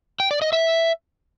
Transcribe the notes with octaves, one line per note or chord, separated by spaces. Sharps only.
G5
D5
D#5
E5